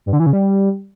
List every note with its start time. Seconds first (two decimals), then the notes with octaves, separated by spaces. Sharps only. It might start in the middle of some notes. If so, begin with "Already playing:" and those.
0.06 G2
0.13 D3
0.20 E3
0.26 C#3
0.33 G3